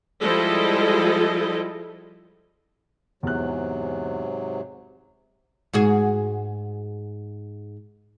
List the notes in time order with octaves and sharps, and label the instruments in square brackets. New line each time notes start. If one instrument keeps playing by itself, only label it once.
[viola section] F3 G3 G#3 E4 A4 D#5
[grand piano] E2 F#6 [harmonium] G#2 C3 F#3
[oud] G#2 F#4 G#4